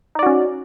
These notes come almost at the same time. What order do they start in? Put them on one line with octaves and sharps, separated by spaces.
D#4 D5 F#4 C#4